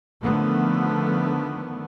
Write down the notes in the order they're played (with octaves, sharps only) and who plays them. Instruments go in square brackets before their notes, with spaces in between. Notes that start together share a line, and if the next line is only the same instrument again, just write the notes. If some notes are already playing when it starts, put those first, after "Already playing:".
[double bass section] D3 D#3 F3 A3 B3